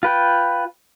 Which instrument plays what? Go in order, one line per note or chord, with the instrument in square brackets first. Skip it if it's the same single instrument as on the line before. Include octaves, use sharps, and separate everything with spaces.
[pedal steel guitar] F4 B4 G5